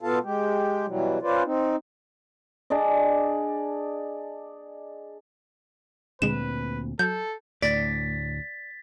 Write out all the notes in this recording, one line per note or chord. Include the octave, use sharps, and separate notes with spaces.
B2 B3 F4 A4 F5 A5
G#3 G4
B2 E3 F#3 G3
C#4 F4 B4 C5 D5
C4 D#4
D4 G#4 D5 D#5
D2 A#2 D3 G#3 C4 B4 E7
F#3 A4 G6
D2 A2 D5 A6 B6